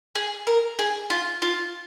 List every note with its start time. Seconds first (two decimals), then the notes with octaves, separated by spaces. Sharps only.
0.15 G#4
0.47 A#4
0.79 G#4
1.10 F4
1.42 F4